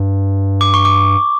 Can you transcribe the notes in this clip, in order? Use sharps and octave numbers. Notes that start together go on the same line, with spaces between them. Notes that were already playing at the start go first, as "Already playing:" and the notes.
Already playing: G2
D6
C#6
D6